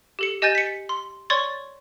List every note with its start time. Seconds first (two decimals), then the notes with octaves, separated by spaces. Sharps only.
0.19 G4 A4 C#7
0.42 G4 D#5 G#5 G6 A6 D#7
0.55 B6 C#7
0.89 C6
1.30 C#5 D5 C6 C#6 G#6 A6